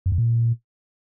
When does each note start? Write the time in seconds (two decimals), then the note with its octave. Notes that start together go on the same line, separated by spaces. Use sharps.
0.06 F#2
0.12 F2
0.18 A#2